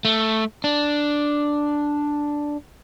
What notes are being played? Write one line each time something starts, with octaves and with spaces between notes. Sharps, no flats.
A3
D4